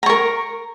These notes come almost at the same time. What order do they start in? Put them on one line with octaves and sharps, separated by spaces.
A#5 C#6 A#4